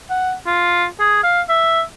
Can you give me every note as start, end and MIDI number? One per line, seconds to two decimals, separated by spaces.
0.10 0.33 78
0.46 0.85 65
1.00 1.21 68
1.23 1.41 77
1.49 1.82 76